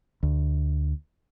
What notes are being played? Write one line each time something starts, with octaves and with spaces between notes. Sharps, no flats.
D2